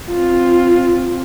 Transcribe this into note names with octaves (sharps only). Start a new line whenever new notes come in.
C4 F4